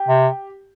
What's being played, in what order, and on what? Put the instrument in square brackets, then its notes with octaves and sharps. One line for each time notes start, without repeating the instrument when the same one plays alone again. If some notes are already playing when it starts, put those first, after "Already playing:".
Already playing: [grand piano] G4
[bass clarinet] C3